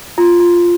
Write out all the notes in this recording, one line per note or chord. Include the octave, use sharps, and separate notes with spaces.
F4
F4